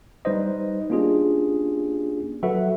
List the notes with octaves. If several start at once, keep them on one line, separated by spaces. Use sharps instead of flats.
G3 D#4 B4 C5 D#5
A#3 C#4 D4 F4 G4 G#4
F#3 F#4 A4 B4 E5 F#5